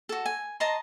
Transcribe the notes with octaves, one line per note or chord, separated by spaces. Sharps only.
F#4 A4
G#5
D#5 A5 A#5 C6